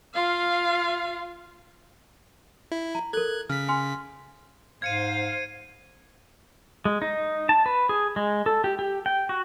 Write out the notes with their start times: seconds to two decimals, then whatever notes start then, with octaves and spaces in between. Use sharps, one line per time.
0.14 F4 F5
2.72 E4
2.95 A#5
3.13 A4 A#4 F#6 G#6
3.50 C#3 F6 B6
3.68 G#5 C6 F6
4.82 G#2 C5 F5 G#6 C#7 D#7
6.85 G#3
7.02 D#4
7.49 A5
7.66 B4
7.89 G#4
8.16 G#3
8.46 A4
8.64 G4
8.79 G4
9.06 G5
9.29 F#4